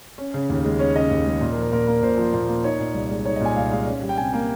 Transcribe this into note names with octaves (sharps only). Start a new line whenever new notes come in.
C#4
C#3
D#2
G#3
C#4 C#5
C#3 D#5
D#2
G#3
A#2
A#4
F3
A#4
A#2 A#4
A#3 A#4
A#2 C5
F3
A#2
A#3
D#4 C#5
A#2
C2
G#3
D#4 C#5
D#5
A#2
G#5
C2 F5
G#3 F5
C#4
G3
G5
C3 G#5
A#3 G5